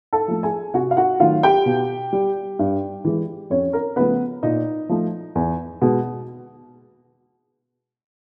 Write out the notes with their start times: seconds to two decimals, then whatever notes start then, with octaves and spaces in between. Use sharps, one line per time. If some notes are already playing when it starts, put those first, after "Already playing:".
0.13 A4 A5
0.28 F3 A3
0.43 G#4 G#5
0.74 C3 F#4 F#5
0.91 F5
0.97 F#4 F#5
1.20 D#3 F#3 A3 F4 F5
1.43 G4 G5
1.66 B2
2.13 G3
2.59 G2
3.05 E3 G#3
3.50 F2 C#4 C#5
3.73 A#4
3.96 C#3 F3 A3 B3 B4
4.43 A#2 D#4 D#5
4.89 F3 A3
5.35 E2
5.82 B2 G#3